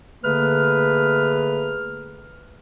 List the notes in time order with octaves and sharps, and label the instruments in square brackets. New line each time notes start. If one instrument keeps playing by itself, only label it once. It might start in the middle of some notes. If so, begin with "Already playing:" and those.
[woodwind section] D3 A3 A#3 G#4 B4 F6